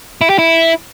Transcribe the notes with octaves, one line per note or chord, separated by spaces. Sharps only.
E4
G4
E4